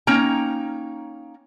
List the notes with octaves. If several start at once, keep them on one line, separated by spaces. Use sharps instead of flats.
A#3 C#4 D#4 G5 A#5